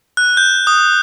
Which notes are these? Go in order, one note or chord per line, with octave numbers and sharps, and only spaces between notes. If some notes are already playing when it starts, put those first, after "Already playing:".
F#6
G6
D#6